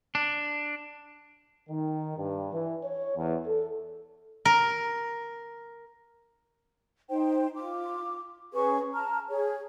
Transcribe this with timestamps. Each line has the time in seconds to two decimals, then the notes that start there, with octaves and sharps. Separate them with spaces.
0.15 D4
1.69 D#3
2.17 G2
2.53 E3
2.84 C#5
3.16 E2
3.47 A4
4.45 A#4
7.09 D#4 C5 G5
7.55 F4 D6
8.53 C#4 G#4 B4 C#6
8.93 A5 A#5 F6
9.29 G#4 C#5